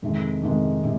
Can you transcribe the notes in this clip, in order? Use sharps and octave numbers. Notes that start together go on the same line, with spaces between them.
F2 C3 D#3 G#3
F2 C3 D#3 G#3
C3